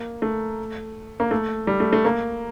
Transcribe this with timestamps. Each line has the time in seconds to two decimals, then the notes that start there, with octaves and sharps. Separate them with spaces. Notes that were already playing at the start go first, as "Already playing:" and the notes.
Already playing: A#3
0.22 A3
1.20 A#3
1.31 A3
1.67 G3
1.80 A3
1.93 A3
2.05 A#3